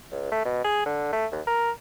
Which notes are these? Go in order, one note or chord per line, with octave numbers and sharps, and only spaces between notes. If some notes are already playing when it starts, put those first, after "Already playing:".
C#2
A3
B2
G#4
D3
A3
D#2
A#4